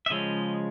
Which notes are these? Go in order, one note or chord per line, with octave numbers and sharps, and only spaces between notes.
E5
C#3 F3 G#3 C#4 D#5